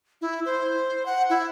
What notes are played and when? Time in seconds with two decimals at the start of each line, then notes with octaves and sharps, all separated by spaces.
0.21 E4
0.46 C5
1.06 F#5
1.30 E4